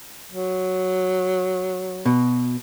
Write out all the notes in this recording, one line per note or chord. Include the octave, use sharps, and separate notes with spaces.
F#3
B2